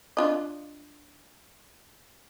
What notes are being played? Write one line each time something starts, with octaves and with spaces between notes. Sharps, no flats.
D4 F4 D#5